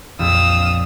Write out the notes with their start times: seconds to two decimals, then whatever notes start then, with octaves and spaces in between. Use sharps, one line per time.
0.19 A#1 F2 F5 D#6 E6 E7